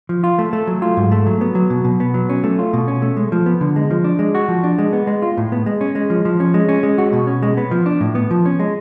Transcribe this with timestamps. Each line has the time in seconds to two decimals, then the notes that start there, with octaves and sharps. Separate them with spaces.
0.09 F3
0.24 F4
0.39 A3
0.53 A3
0.67 F#3
0.82 F4
0.97 G#2
1.11 A3
1.27 F#3
1.41 B3
1.55 F#3
1.70 B2
1.84 B2
2.00 B3
2.14 F#3
2.29 C#4
2.44 A3
2.59 F4
2.73 B2
2.88 C#4
3.02 A3
3.17 G#3
3.32 F3
3.46 B3
3.61 D3
3.76 G#3
3.91 F3
4.04 D4
4.19 G#3
4.35 F#4
4.48 F3
4.64 D4
4.78 G#3
4.93 B3
5.07 G#3
5.22 F4
5.37 A2
5.52 B3
5.66 G#3
5.81 C#4
5.95 G#3
6.10 F3
6.25 F3
6.40 C#4
6.54 G#3
6.69 C#4
6.83 G#3
6.98 F#4
7.13 B2
7.27 C#4
7.43 G#3
7.57 B3
7.71 F3
7.86 D4
8.01 A2
8.15 B3
8.31 F3
8.45 C#4
8.59 G#3